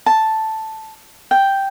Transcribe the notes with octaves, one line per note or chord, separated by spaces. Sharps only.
A5
G5